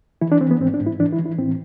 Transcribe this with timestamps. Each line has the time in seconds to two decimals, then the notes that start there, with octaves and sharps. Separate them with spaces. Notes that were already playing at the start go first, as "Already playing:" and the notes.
0.22 E3 E4
0.32 D4
0.41 E3 C4
0.51 B3
0.60 G#2 C4
0.74 D4
0.80 G#2
0.87 E4
1.00 E3 D4
1.13 E4
1.19 E3
1.26 E4
1.38 A2 C4